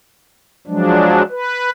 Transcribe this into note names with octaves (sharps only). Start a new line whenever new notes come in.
F3 F#3 G#3 D4
B4